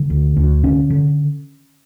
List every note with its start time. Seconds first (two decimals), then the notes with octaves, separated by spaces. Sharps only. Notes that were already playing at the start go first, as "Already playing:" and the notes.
Already playing: D3
0.10 D2
0.37 D2
0.64 D3 C#4
0.90 D3